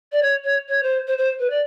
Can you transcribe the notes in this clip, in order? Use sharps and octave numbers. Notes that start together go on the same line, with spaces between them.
D5
C#5
C#5
C#5
C5
C5
C5
B4
D5